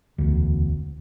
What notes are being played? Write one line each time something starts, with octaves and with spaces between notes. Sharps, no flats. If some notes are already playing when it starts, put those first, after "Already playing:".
E1 D2